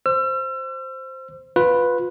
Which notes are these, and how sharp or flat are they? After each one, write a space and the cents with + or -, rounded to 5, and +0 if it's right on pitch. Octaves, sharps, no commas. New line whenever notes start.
C5 +0 E6 +40
F4 +25 B4 +0